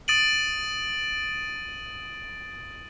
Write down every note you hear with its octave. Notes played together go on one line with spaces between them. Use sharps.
D#6 A6 D7 D#7 F#7